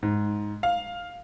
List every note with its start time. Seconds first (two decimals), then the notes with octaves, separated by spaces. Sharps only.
0.03 G#2
0.63 F5